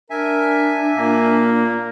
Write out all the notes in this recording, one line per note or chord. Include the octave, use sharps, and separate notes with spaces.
D4 A#4 E5 G#5
A#2 A#3